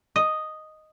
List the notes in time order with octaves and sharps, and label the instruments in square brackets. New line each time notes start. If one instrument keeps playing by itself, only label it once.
[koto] D#5